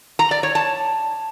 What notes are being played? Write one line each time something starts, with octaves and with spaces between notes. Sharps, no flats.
A#5
D5
C#5
A5